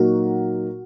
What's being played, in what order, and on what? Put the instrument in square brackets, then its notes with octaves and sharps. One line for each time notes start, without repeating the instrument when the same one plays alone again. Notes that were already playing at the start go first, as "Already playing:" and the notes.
Already playing: [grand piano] A#2 F#3 A#3 D#4 A#4 [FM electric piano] F#4